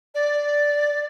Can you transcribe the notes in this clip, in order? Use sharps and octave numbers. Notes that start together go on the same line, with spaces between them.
D5